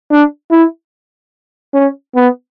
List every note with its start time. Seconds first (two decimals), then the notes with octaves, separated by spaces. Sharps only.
0.11 D4
0.51 E4
1.74 C#4
2.15 B3